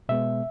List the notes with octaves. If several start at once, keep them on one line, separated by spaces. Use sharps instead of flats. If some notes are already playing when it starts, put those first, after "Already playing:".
B2 G#3 B3 E5